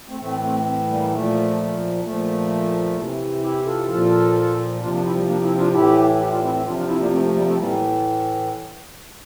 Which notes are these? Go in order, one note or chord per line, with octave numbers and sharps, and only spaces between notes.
A3 C4
A2 E3 A3 C4
A3 C4
G3 A#3
A#2 F3 A3
A#2 F3 A3
C3 E3
E4 G4
F4 A4
A#2 F3 F4 A4
C3 F3 D4 F4
A#3 D4
C4 E4
G3 A#3
A#3 D4
C4 E4
D4 F4
A2 E3 E4 G4
E4 G4
D4 F4
C4 E4
C4 E4
C3 F3 D4 F4
D4 F4
C4 E4
A#3 D4
A3 C4
A3
G3 A#3
A3 C4
A2 E3 G3 A#3